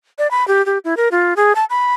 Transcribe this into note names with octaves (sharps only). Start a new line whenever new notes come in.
D5
B5
G4
G4
E4
A#4
F4
G#4
A5
B5